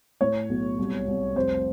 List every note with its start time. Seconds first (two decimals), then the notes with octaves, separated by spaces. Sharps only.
0.21 A2 C#5
0.49 B1
0.79 C2
1.08 C2
1.35 F1 C5